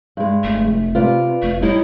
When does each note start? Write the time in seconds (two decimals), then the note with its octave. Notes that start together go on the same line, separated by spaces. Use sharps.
0.17 G2 G#3
0.44 F1 A3
0.95 C3 F4 B4 D5
1.42 F1 A3
1.62 G3 D#4 E4 C#5